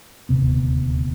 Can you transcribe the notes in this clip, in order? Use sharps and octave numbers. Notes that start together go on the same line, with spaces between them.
D#1 D2 C3 B3